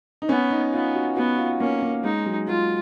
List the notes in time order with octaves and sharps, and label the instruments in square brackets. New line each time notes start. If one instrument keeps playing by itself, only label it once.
[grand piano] D#4
[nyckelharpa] B3 [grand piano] C#4
[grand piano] D#4
[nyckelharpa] B3 [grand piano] F4
[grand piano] F#4
[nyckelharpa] B3 [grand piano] F#4
[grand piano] F4
[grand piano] A#3 [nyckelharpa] C#4
[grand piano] A#3
[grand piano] G#3 [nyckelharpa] D#4
[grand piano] F#3
[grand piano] G#3 [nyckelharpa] F4